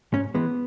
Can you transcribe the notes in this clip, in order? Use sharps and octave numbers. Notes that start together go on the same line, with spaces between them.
G#2 C#4
E3 G#3 B3